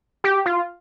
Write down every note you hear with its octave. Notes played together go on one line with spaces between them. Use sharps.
G4
F4